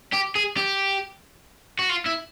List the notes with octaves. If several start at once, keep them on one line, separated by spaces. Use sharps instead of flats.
G4
G#4
G4
F#4
F4
E4